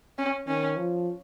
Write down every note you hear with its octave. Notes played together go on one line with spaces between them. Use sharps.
C#4
D#3 C#4
F3